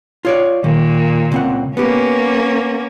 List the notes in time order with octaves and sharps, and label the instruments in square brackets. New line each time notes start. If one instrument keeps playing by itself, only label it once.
[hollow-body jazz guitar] F4 C#5 D5
[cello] A#2 [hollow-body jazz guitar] D#3
[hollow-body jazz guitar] C#2 C4 F#5
[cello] A#3 C#4 [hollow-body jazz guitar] B3 G4